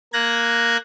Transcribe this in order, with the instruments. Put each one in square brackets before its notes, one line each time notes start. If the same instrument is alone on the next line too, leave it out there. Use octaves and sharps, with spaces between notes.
[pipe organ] A#3 F#6 G#6 A#6